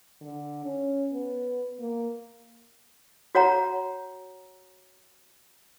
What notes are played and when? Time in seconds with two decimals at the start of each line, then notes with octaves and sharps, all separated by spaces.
0.21 D3
0.65 C#4
1.13 B3
1.79 A#3
3.35 F#4 C#5 F#5 A#5